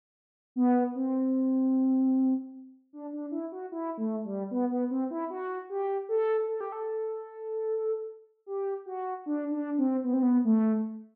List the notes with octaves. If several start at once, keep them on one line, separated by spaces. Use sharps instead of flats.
B3
C4
D4
D4
E4
F#4
E4
A3
G3
B3
B3
C4
E4
F#4
G4
A4
A4
G4
A4
G4
F#4
D4
D4
C4
B3
C4
B3
A3